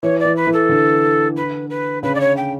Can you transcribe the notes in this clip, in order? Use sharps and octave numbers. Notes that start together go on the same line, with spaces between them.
E3 C#5
D5
E3
B4
E3
A4
D3
B4
B4
C#3 B4
D5
C#5
G5